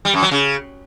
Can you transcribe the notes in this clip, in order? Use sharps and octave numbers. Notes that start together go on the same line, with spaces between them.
G3
F#2
F#3
C#3